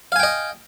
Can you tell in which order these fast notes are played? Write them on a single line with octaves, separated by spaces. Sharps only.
F5 G#5 G5 D#5